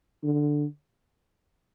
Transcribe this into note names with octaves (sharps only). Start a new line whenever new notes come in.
D3